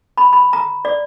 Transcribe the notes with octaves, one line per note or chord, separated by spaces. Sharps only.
B5
B5
A#5
D5